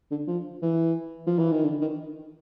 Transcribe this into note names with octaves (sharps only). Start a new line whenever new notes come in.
D3
F3
E3
F3
E3
D#3
D3
D#3